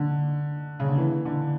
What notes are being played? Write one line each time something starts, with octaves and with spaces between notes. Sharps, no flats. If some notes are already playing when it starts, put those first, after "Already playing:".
Already playing: D3
C#3
D3
E3
D3